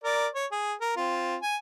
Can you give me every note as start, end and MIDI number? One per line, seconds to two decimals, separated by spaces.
0.04 0.27 70
0.04 0.27 74
0.35 0.46 73
0.52 0.73 68
0.81 0.92 70
0.96 1.36 60
0.96 1.36 65
1.42 1.56 80